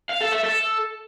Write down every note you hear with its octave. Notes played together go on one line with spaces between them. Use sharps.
F5
A4
E5
A4